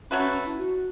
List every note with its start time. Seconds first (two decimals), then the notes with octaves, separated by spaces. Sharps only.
0.10 F#3 A3 C#4 F#4 B4
0.23 C#4
0.34 C#4
0.47 E4
0.58 F#4